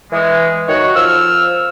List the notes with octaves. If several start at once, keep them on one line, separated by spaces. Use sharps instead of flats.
E3 G#3
D#3 F#4 C#5
F3 E6 F6